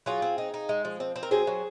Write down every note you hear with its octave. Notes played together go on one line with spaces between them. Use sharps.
F#3 F4 G#4
C4
D#4
D#4
G#3
F3
C4
C4
A#4
F#3 G#4 C5
F#3